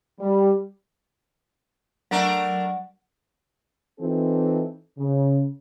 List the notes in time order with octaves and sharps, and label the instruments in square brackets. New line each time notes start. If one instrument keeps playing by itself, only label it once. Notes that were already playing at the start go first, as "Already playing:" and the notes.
[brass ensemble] G3
[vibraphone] F#3 [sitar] A3 D4 A#4
[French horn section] E3 C4 D#4 F4 A4
C#3